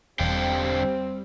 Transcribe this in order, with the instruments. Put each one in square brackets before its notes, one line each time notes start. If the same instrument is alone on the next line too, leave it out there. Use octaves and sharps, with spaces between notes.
[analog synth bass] E1 [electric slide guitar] D3 F5 G5 [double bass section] G3 [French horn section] C4